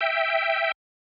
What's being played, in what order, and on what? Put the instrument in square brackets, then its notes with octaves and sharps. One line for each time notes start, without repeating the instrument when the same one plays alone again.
[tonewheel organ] E5 G5